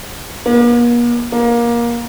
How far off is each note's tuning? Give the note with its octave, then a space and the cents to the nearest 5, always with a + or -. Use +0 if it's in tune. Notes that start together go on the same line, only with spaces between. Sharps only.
A#3 +45
A#3 +20